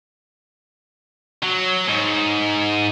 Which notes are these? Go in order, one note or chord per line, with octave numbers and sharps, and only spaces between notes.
F#3
G#2